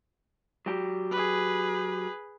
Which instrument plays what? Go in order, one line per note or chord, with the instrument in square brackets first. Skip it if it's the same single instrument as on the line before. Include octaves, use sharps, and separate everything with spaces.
[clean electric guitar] F#3 G4
[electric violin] G#4 B4